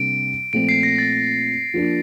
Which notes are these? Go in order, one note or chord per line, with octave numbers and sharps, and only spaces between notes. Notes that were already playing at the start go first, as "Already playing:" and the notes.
Already playing: C3 G3 A#3 D4 D7
A#2 F3 A3 C4 D7
C7
A#6
A6
F3 A#3 D4